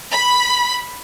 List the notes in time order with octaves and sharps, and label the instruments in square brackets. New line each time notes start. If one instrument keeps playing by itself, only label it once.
[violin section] B5